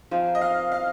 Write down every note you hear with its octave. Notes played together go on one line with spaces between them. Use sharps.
F3 C4 D#4 G#4
D#5
F5
F5